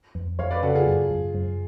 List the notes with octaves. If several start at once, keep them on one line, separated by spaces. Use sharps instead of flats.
F2
F2 C#5 F5
B4 D5
C#3 F#4 A4
F4 G#4
F#2
F#2
F#2